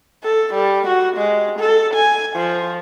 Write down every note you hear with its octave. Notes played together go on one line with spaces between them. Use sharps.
A4
G3
F#4
G#3
A4
G#5
F3